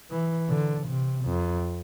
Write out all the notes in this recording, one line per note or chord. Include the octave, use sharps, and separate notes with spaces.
E3
D3
C3
F2